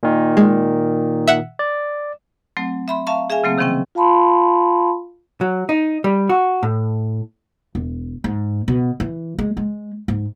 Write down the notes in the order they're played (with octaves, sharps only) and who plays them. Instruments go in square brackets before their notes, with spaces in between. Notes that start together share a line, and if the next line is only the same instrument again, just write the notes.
[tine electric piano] A#2 D#3
[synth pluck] G#3
E5 F#5
[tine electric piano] D5
[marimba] F#3 A3 C4
E5 B5 C6
E5 F5 A5 A#5 C#6
G#4 E5 F5 G#5
C#3 F#3 A3 A#3 C4
C3 D#3 F3 C4 C#4 G5
[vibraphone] F4 F5 A5 B5 C6
[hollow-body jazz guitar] F#3
D#4
G3
F#4
A2
[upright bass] E1
G#2
B2
E3
G#3
G#3
G#2